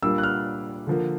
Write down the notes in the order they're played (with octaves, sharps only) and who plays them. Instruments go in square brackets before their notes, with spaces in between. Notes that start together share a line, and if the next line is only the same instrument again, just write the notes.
[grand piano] A#2 G3 A#3 D4 E6
F#6
F6
D3 F3 A#3